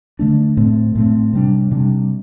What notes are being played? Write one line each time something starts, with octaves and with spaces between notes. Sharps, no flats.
D3 A3 D4
A2 A3 C4
A2 A3 C4
C3 G3 D4
C3 G3 D4